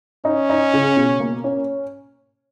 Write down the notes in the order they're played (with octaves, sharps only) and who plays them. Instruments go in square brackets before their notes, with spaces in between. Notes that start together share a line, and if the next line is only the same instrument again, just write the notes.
[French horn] C#4 [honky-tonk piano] D#4
[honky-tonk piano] D#4
C#3
B2
A#3
C#4